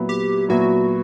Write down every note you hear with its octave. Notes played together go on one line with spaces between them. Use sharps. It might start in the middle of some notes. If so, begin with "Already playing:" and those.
Already playing: A#2 F#3 B3 E4
G4
A#2 F#3 B3 E4 F#4